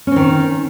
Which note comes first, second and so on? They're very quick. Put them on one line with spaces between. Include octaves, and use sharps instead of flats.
C#4 C4 D#3